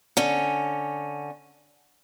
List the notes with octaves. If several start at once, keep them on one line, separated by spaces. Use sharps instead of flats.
D3 C#4